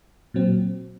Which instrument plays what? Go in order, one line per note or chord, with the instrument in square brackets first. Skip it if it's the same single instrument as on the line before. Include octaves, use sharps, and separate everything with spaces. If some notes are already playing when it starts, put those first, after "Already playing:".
[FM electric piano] A#2 F#3 C4